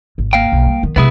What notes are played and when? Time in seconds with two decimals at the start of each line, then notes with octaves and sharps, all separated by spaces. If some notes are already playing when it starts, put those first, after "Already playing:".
0.18 G#1
0.33 A#3 F5 G5
0.52 B1
0.66 G3
0.83 D#3 B3
0.96 C3 G#3 B3 E4 G#4